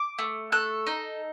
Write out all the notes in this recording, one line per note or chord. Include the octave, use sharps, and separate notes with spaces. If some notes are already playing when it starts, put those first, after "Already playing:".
Already playing: D6
A3
A4 F#6
D#4